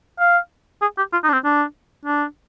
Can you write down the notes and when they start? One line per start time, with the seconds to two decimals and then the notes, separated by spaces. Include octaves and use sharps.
0.19 F5
0.82 G#4
0.98 G4
1.12 F4
1.24 D#4
1.29 D4
1.33 C4
1.44 D4
2.05 D4